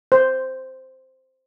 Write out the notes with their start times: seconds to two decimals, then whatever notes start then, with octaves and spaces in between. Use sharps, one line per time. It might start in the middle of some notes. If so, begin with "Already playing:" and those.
0.12 C5